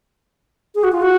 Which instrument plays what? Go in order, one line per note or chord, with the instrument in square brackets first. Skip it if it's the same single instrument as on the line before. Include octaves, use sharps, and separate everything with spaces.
[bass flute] G#4
F#4
F4
F#4